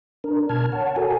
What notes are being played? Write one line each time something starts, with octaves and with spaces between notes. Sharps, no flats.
D4 A#4
B2 A5 F6 G#6
C#5 F#5 A5
F#4 A4 A#4 G#5